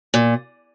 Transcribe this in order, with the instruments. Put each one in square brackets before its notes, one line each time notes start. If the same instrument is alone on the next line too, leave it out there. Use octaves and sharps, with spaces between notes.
[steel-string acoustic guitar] A#2